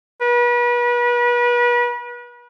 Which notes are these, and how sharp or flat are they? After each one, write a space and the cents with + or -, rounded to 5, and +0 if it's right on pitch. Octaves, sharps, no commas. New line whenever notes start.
B4 -35